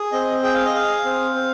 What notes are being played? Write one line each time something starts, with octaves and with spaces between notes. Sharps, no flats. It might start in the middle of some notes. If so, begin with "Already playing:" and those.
Already playing: G#4
C4 D#5
G#4 G5
F5
D#5
G#4 F5
C4
C4